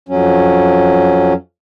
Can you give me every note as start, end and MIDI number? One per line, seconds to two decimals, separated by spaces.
0.09 1.33 41
0.09 1.33 54
0.09 1.33 61